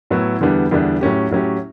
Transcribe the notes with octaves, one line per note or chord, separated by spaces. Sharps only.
A2 F#3 B3 E4
E2 D3 G3 B3 D4
E2 D3 G3 B3 D4
A2 F#3 C#4 G4
A2 F#3 C#4 G4